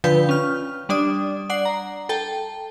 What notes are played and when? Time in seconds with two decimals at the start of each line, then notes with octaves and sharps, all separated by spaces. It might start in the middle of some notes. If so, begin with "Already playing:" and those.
0.04 D3 F3 B4 G5 G6
0.29 C#4 F6
0.89 G3 D4 D5 D#6
1.50 D5 F#5 C7
1.65 A#5
2.09 A4 G5 A5